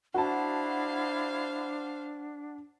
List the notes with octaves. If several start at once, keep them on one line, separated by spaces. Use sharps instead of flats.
D4 E4 F#4 C5 F5 A5